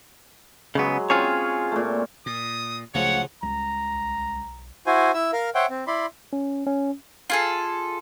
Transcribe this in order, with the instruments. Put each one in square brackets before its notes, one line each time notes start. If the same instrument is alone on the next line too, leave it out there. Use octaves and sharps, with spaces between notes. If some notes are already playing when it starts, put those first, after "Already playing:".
[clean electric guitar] C#3 B3 [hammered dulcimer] F#3 G#3
[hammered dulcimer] C4 C#4 [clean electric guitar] F4 G#4 C#5
[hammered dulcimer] A#2 A3
[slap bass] A#2 [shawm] D#6
[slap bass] C#2 A3 [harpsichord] C#3 F3 F#3 [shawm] C#5 [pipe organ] F#5
[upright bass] C#2 G3 [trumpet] A#5
[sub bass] B1
[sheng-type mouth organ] E4 F#4 C5 G#5
E4 E5 E6
A#4 F5
C5 C#5 E5 F#5 G5
C4
E4 D5 B5 C6
[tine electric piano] C#4
C#4
[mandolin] F4 G#4 A4